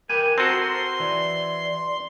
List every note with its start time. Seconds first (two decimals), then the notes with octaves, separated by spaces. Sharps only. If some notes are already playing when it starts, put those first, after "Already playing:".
0.09 G4 A#4 B4 G#5
0.38 C4 F#4 A4 A#4 C5 C6
1.00 E3 D5